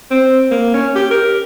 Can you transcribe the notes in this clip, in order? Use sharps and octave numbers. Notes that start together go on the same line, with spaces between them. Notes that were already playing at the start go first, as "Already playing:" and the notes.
C4
A#3
C#4
G4
A#4